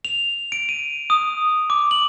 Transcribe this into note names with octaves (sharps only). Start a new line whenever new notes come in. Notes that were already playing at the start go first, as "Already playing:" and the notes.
F7
D7
D#7
D#6
D6
F#7